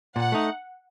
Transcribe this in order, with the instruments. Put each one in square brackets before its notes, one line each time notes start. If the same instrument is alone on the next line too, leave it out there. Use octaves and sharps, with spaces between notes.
[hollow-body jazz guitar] A#2 [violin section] F#5
[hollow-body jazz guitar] A3 D#4